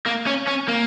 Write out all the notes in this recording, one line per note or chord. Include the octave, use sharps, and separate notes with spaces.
A#3
C#4
C#4
A#3